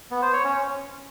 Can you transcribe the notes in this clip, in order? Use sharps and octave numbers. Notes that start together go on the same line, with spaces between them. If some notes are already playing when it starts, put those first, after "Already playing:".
B3
C5
C#5
C#4